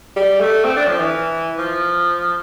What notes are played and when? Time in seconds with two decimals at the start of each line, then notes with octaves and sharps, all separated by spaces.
0.16 G3
0.41 A3
0.64 C4
0.76 D4
0.88 F3
0.99 E3
1.58 F3